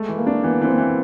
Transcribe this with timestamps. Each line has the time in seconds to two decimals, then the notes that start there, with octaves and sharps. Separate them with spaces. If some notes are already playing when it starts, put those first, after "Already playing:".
Already playing: G#3 A3
0.09 E3
0.18 A#3
0.27 D4
0.43 E3 B3
0.62 E3 C4
0.69 B3
0.78 E3